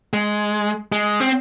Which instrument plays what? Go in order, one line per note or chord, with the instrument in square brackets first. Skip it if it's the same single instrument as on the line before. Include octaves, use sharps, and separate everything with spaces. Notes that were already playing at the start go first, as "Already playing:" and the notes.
[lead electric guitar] G#3
G#3
C4